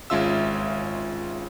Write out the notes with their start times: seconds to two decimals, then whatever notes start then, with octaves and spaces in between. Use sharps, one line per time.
0.10 G#1 G#3 C#4 F4 E5 E6